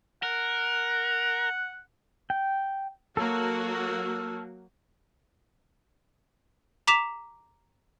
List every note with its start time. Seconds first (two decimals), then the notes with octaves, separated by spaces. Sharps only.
0.23 A#4 F#5
2.30 G5
3.17 F#3 A#3 F#4 A4 A#4
6.87 A#5 D6 B6 E7 F7